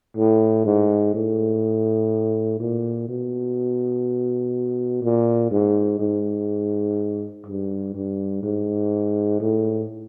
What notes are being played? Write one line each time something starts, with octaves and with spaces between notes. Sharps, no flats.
A2
G#2
A2
A#2
B2
A#2
G#2
G#2
G2
G2
G#2
A2